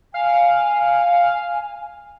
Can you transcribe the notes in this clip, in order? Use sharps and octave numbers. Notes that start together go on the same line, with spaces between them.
F5 G#5